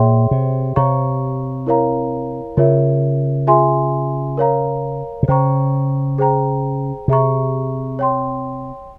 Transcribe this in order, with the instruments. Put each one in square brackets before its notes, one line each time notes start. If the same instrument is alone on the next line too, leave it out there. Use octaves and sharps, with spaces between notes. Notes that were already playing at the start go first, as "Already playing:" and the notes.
Already playing: [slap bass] A#2 [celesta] G#4 C#5 E5 G5 C6
[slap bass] C3
[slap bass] C3 [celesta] C#5 F5 A#5 C#6
[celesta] E4 A#4 C#5 F5 A#5
[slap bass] C#3 [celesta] F4 A#4 C#5 E5
[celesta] F4 G#4 E5 G#5 C6
A#4 C#5 F5 A#5
[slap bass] C3
[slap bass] C#3 [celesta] C5 G5 A#5 C#6
[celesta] G#4 C5 G5 A#5
[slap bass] C3 [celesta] G#4 E5 A#5 C#6
[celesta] C#5 G5 C6